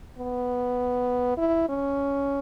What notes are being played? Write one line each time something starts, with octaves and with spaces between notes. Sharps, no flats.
B3
E4
C#4